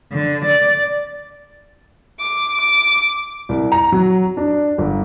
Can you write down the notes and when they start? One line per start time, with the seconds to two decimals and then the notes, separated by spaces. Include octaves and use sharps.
0.13 D3
0.46 D5
2.20 D6
2.60 D6
3.49 C2
3.72 A#5
3.92 F#3
4.37 D4
4.78 G1